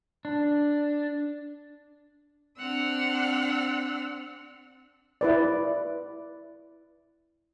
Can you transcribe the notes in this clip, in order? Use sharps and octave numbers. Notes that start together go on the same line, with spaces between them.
D4
C4 D4 F#5 E6 F6
E4 B4 D5